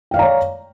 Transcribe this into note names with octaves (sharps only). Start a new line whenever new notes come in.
C#5 D5 F5 G5 A#5